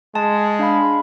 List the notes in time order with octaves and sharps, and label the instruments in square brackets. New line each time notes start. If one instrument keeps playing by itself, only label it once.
[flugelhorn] G#3 [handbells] A5
[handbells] D4 F5 B5